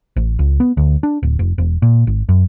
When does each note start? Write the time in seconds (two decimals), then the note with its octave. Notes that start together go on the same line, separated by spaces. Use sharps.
0.16 A1
0.39 C#2
0.60 B3
0.77 D2
1.03 D4
1.23 D1
1.39 F1
1.58 E1
1.82 A#2
2.07 G#1
2.29 F#2